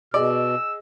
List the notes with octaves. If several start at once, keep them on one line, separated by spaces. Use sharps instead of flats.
B2 G#4 D5 D#5 E6